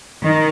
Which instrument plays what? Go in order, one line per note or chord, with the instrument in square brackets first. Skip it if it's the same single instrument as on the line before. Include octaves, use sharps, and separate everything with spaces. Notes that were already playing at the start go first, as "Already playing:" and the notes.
[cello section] D#3